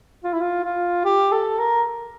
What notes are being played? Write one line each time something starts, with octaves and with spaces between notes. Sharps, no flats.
F4
E4
F4
F4
G4
A4
A#4